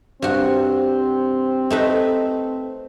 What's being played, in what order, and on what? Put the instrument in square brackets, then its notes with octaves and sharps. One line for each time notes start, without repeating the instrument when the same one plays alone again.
[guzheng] G2 F#4 [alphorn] C4
[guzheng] A3 D#4 B4